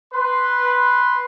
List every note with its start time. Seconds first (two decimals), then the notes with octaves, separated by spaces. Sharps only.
0.13 B4 C6